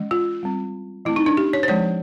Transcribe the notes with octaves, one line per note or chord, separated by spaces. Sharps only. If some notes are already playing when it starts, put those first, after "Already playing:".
Already playing: E3 G#3 C#4
F4
G3 C4
E3 A3 C4 E4
D#4
D4
G4
C#5
C5
F3 G#3 C4 C#5